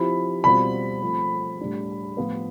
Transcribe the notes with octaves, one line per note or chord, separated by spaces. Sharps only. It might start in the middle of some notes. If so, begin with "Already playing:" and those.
Already playing: F3 C4 E4 G4 B5
B2 G3 C4 F4 B5
F3 A3 C4
A2 G3 D4 G4
A2 F3 B3 F4 B4